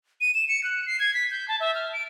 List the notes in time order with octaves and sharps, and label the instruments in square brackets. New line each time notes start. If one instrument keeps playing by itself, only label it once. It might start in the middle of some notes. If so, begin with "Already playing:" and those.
[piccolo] D#7
E7
C#7
F#6
C7
G#6
B6
G6
A5
E5
F6
D7